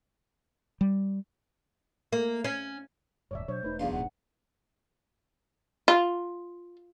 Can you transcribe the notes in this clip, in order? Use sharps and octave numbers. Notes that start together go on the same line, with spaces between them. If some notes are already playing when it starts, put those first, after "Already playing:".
G3
A#3
C#4
D#1 D2 G2 C#5 D5 E5
B2 F#3 D4 C5 C#5
E1 A3 D#4 B4 C#5
B1 E2 D4 C5 F5
D#1 G#2 F#5
F4